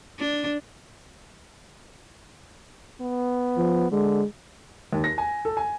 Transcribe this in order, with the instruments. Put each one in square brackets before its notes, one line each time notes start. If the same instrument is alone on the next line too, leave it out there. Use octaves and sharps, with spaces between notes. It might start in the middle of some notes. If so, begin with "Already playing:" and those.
[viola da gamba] D4
[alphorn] B3
[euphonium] F3
[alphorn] D3 [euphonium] G#3
[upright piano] D#2
A#6
G#5
A4
G#5